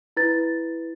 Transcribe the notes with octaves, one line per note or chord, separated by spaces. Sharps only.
E4 B4 A6